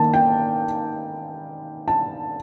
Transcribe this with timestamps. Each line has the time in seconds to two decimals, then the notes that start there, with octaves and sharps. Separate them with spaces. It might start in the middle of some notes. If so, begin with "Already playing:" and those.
Already playing: D#3 A#3 A5
0.14 G5
1.88 A5